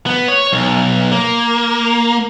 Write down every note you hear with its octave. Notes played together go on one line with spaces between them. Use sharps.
B3
C#5
B1
A#3